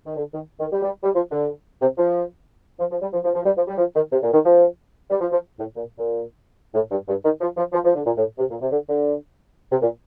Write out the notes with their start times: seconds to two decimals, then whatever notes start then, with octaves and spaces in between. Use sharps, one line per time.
0.06 D#3
0.17 D3
0.34 D#3
0.60 D#3
0.72 G3
0.83 G3
1.04 G3
1.15 F3
1.31 D3
1.81 C3
1.98 F3
2.80 F3
2.91 F3
3.02 G3
3.13 F3
3.24 F3
3.35 F3
3.45 G3
3.56 F3
3.68 G3
3.78 F3
3.95 D#3
4.12 C3
4.23 A#2
4.33 D#3
4.45 F3
5.10 G3
5.21 F3
5.32 F3
5.59 A2
5.76 A#2
5.98 A#2
6.74 A2
6.91 G2
7.08 G2
7.25 D#3
7.41 F3
7.57 F3
7.73 F3
7.85 F3
7.95 D3
8.06 A#2
8.17 A2
8.39 C3
8.50 A#2
8.61 C3
8.71 D3
8.89 D3
9.71 C3
9.82 A#2